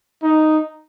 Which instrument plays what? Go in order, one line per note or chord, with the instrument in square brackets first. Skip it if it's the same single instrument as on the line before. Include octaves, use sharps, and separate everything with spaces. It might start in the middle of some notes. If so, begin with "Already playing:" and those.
[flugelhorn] D#4